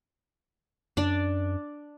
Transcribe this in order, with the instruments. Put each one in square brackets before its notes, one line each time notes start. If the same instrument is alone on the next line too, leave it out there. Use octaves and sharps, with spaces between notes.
[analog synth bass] F#2 [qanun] D4 D5